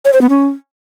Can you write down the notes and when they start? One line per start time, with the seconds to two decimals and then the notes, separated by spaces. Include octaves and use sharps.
0.05 C#5
0.13 C5
0.21 B3
0.30 C#4